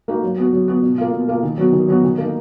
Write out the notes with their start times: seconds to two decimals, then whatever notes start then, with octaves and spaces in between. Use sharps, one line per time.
0.08 A#3 D#4 F#4
0.23 F#3
0.38 B3 F#4
0.53 F#3
0.68 B3 F#4
0.83 B2
0.98 A#3 F4
1.13 B2
1.28 A#3 F4
1.43 D#3
1.58 F#3 B3 F#4
1.73 D#3
1.88 F#3 B3 F#4
2.04 D#3
2.18 A#3 D#4